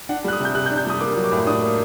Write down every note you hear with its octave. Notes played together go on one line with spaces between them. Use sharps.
D4 F#5
G3 F#6
D#6
C3 G6
C3 F#6
G6
D4
G6
G3 D#6
A#3 D6
F#3
D6
A2
D4 D#6
A#3